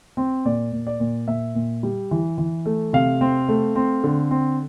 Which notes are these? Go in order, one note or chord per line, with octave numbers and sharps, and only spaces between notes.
C4
A#2 D5
A#2
D5
A#2
A#2 E5
A#2
G3
E3
E3
A3
C3 F5
C4
A3
C4
D3
C4